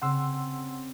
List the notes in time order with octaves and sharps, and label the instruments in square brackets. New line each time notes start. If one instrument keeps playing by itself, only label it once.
[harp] C#3 C4 [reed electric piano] F#5 C6 E6